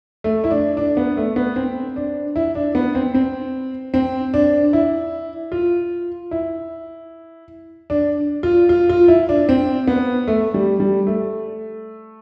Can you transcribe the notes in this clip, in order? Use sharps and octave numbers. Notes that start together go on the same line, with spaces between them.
A3
E4
D4
D4
B3
A3
B3
C4
D4
E4
D4
B3
C4
C4
C4
D4
E4
F4
E4
D4
F4
F4
F4
E4
D4
C4
B3
A3
G3
G3
A3